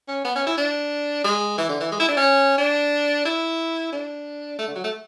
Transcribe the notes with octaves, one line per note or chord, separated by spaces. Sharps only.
C#4
B3
C#4
E4
D4
G#3
E3
D3
E3
G#3
E4
D4
C#4
D4
E4
D4
A3
D3
F#3
A3